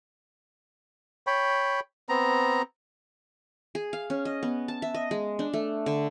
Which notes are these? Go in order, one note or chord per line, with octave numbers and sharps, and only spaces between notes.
C#5 G5 B5
B3 C4 A#5
G#4
F5
C#4
D#5
B3
A5
E5
D#5
G#3
D4
A3
D3